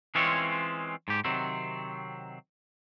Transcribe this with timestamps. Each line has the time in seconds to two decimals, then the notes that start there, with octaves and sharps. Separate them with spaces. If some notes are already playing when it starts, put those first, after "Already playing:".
0.15 E3 G#3 C4 C#4 F4 C#5
1.08 G#2 G4
1.25 C3 D#3 F#3 C4